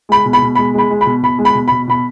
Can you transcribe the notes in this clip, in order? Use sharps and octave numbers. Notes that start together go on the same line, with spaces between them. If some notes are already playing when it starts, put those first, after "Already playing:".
G#3 B5
B2
B5
B2
G#3 B5
G#3 B5
G#3
B5
B2
B2 B5
G#3
B5
B2
B2 B5
B2 B5